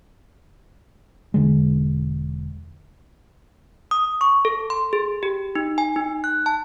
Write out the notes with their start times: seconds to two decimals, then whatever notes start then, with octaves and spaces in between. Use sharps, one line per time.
1.34 E1 D3 G#3
3.91 D#6
4.21 C#6
4.45 A4
4.70 C6
4.93 G#4
5.23 G4
5.55 D#4
5.78 G#5
5.96 D#4
6.24 F#6
6.46 A5